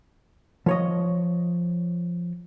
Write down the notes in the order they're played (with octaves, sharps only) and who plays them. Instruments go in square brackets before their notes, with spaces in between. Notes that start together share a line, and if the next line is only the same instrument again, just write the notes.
[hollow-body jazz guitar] F3 C#5 D#5